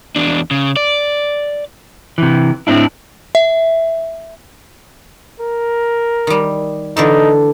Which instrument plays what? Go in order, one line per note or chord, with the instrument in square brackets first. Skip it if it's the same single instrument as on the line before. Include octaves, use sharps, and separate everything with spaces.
[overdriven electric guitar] E2 D4
C#3
D5
[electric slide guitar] C3 E3
A2 C4 D4 E4
[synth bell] E5
[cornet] A#4
[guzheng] D#3 G3
[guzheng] D3 E3 A3 [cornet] D#4